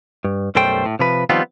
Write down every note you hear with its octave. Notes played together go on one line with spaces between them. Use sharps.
G2
B1 F#2 G3 A3 C5 G5
A2
C3 F3 B4
D#3 F3 G3 B3 C4 F4